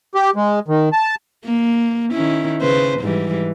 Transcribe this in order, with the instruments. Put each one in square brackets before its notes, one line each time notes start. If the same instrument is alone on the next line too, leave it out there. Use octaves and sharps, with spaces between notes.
[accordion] G4
G#3
D#3
A5
[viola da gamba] A#3
D#3 C#4 E4
C#3 B4 C5
G#2 E3 G3